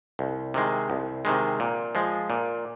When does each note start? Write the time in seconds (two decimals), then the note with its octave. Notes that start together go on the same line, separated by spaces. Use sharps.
0.19 C2
0.54 C3 D#3 G#3
0.90 C2
1.25 C3 D#3 G#3
1.60 A#2
1.95 F3 G#3
2.30 A#2